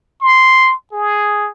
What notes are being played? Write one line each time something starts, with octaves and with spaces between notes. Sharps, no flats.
C6
G#4